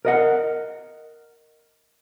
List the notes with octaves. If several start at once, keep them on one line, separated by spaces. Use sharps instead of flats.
A#4 D#5 F#5